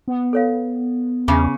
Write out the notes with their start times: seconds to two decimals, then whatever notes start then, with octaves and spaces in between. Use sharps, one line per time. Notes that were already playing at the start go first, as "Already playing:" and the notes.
0.08 B3
0.33 A4 C#5 F5
1.28 E2 C#3 D6